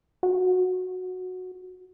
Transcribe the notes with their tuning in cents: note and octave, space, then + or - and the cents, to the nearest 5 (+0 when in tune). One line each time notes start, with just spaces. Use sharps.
F#4 -10